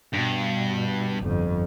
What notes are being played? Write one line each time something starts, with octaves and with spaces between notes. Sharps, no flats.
G2 B2
G1 F2